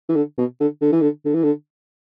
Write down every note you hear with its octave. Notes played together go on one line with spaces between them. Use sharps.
E3
D3
B2
D3
D3
E3
D3
D3
E3
D3